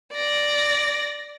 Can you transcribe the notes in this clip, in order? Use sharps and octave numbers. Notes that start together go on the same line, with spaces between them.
D5 A#6